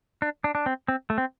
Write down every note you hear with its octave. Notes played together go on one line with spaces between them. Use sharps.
D4
D4
D4
C4
C4
A3
C4